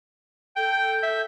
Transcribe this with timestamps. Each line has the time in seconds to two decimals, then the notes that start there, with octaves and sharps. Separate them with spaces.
0.56 A4 G5 G6
1.03 E5